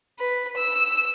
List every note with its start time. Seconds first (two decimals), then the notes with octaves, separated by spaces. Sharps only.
0.19 B4
0.57 E6